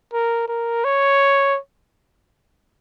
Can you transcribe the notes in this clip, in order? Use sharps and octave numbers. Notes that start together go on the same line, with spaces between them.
A#4
A#4
C#5